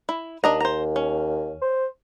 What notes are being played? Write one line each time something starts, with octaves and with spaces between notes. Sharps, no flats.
E4
D#2 D4 D#5 A#5
C5 A#5
C#4
C5